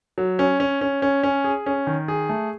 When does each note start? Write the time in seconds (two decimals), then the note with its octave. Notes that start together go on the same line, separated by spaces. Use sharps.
0.18 F#3
0.39 C#4
0.60 C#4
0.81 C#4
1.02 C#4
1.23 C#4
1.44 G#4
1.66 C#4
1.87 D#3
2.08 G#4
2.29 A3